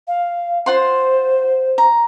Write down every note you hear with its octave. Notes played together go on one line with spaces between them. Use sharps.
F5
F4 C5 F#5 C6
A#5